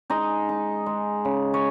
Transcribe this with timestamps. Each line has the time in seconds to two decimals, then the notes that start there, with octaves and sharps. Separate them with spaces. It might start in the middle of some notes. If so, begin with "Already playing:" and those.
0.10 G#3 D#4 D#5
0.49 D#4
0.86 G#3
1.25 C#3
1.54 C#5